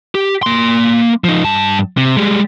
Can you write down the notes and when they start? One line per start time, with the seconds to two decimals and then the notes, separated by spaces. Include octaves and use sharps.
0.15 G4
0.43 A#3 C6
1.24 F3 D#4
1.44 G2 A5
1.97 C3
2.17 G3 G#3